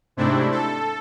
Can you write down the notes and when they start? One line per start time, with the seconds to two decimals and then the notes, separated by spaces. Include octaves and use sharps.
0.17 G#2 C3 A3 C4 D4 E4
0.51 A4